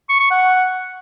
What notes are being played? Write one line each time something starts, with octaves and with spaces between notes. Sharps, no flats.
C#6
C#6
F#5